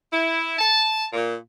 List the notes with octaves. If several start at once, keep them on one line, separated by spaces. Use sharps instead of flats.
E4
A5
A#2